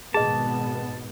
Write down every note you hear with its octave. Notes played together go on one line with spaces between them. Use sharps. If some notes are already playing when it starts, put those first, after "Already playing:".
G#1 B2 B3 G#4 D#5 A5